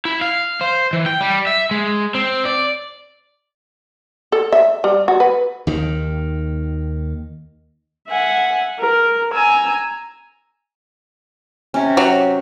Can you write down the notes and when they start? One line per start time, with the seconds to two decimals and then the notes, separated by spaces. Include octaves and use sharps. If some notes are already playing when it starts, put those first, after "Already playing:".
0.05 E4
0.21 F5
0.61 C5
0.93 E3
1.06 G5
1.21 G3
1.47 E5
1.71 G#3
2.15 C4
2.45 D5
4.32 A4
4.52 E5
4.84 G3
5.08 F#4
5.20 B4
5.67 D#2 D#3
8.09 E5 F#5 G#5
8.81 A#4
9.33 G#5 A#5 E6
11.74 C3 C#4
11.97 F#3